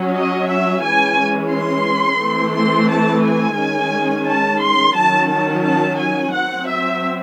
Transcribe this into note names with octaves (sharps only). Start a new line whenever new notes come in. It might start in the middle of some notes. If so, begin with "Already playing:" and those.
Already playing: F#3 C#4
D#5
E5
E3 G#3 C#4 G#5
C6
E3 A3 C4
C6
A5
G#5
D#3 G#3 C#4
A5
C6
D#3 F#3 C#4 A5
A5
A5
G#5
F#3 C4 F#5
E5